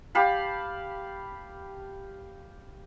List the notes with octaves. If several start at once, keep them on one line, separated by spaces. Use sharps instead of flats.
G4 F5 A5 B5